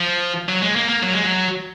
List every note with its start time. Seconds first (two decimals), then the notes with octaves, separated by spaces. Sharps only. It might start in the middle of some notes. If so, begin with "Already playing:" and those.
Already playing: F3
0.49 F#3
0.62 G#3
0.76 A#3
0.89 A#3
1.03 F#3
1.14 G#3
1.23 F#3